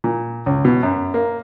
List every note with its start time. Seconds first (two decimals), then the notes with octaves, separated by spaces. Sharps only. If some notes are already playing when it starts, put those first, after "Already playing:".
0.04 A#2
0.46 C#2
0.65 B2
0.83 F#2
1.14 A#3